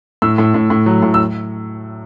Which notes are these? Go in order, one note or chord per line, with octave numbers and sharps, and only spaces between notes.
A2 E6
A2
A2
A2
F#3
A2
E6